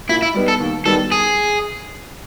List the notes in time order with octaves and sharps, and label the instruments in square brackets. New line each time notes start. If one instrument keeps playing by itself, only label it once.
[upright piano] A#2 [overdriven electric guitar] E4
[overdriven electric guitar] E4
[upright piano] G3 B3 D#4
[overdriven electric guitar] A4
[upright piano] D#2
[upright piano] D#3 G3 B3 [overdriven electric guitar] A4
[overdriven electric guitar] G#4